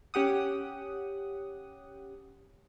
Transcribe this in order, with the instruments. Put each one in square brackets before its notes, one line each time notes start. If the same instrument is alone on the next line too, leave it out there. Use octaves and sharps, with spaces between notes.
[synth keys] C#4 G4 F#5 D#6